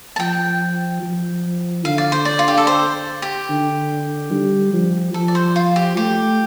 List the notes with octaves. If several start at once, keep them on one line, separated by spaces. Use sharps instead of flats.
A5
F3 G5
F3
D3 F5
D5
C5
D5
F4
G4
A4
C5
G4
D3
G3
F3
F3 A4
D5
C5
F4
G4
A3 G4